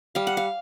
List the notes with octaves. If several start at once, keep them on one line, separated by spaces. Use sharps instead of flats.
G3 F5
F#5
F5